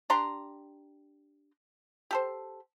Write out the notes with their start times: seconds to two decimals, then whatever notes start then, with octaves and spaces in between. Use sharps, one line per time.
0.10 D4 G4 A#5 C6
2.11 G4 A4 C5